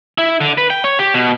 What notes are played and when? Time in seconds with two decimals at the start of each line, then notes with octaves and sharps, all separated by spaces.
0.18 E4
0.41 D3
0.58 B4
0.70 G5
0.84 C#5
0.99 G4
1.14 B2